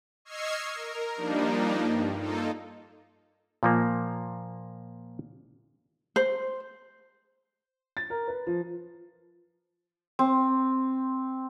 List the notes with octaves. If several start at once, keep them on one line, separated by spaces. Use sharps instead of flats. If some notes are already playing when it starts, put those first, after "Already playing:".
D#5 C#6 E6 F6 G#6 C7
A#4
F3 G3 A#3 D4 D#4
G2
A#3 D#4 F4 A4
A#2 F3 A#3
C5
A6
A#4
B4
F3
C4